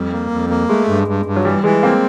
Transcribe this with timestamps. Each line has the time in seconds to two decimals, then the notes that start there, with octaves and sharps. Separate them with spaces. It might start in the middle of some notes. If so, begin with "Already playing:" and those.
Already playing: F2 G3
0.12 A#3
0.31 F2
0.50 A#3
0.69 G#3 A3
0.88 G2
1.08 G2
1.25 G2
1.36 F#3
1.45 E3 G3
1.64 E3 G#3
1.83 A#3 C4